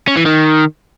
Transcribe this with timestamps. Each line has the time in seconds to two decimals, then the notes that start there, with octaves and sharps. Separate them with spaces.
0.07 C#4
0.17 E3
0.26 D#3